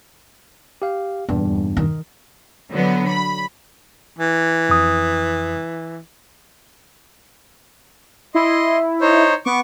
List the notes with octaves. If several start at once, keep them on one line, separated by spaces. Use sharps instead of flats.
G4 F5
D#1 E2 G2
D#3
D3 F#3 B3
B5
E3
F2 D#6
E4 D#5 C6
D#4 C5 C#5
B3 C#6 D6